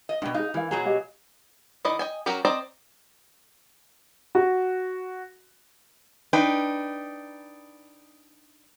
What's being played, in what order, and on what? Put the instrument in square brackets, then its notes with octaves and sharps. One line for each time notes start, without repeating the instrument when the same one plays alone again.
[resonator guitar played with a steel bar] D#5
[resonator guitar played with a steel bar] G#2 B2 [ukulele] D4 G5
[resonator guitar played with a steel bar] D#4 [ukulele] G#4 F5
[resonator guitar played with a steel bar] E3 [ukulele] A#4 B4 F5
[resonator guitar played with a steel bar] B2 F#3 G#4 [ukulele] A#5
[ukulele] G4 D#5 F5
[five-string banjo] D#3 E4 D5 D#5
D#5 G5 G#5
F#3 C#4 F#4 G4 A#4
C4 C5 D5 D#5 A#5
[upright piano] F#4
[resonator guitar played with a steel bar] D4 D#4 B4 G5